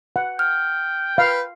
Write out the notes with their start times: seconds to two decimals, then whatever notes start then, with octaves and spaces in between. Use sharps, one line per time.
0.16 F#5
0.39 G5 F6
1.18 B4 F5